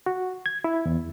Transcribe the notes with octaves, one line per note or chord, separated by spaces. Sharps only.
F#4
G#6
E4
E2